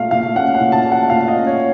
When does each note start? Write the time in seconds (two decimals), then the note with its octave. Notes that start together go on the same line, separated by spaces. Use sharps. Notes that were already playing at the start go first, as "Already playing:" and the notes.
Already playing: A#2 A3 F5
0.11 A#2 F5
0.35 C#4 F#5
0.55 F#5
0.60 A#2
0.72 A5
0.85 A3
0.92 F#5
1.10 A#2 F5
1.28 D#5
1.35 C#4
1.47 C#5